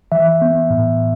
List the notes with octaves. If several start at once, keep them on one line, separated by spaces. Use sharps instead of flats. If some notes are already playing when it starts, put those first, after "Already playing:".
E3 E5
B3
A2